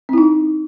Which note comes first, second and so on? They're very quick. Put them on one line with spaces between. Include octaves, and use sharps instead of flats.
C4 E4 D#4